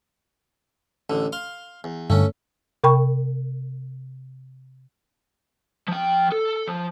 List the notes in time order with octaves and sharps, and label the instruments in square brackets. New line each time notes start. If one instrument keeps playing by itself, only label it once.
[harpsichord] A1 D3
F5 C6
E2
[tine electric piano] G2 D3 [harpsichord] A3 C#4
[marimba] C3 A#4 G5 B5 C#6
[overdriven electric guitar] F3 G5
A4
F3